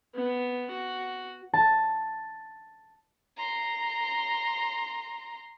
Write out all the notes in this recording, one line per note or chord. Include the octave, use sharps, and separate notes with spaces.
B3
F#4
A5
A#5 C6